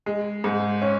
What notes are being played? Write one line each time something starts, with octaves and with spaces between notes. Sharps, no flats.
G#3
G#2
C#4